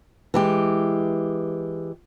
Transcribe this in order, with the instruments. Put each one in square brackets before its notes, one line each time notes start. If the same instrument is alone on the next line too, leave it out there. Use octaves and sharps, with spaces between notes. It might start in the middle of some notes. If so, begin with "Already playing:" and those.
[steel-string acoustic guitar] E3 G#3 G4